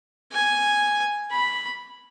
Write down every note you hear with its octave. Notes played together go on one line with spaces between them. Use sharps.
G#5
B5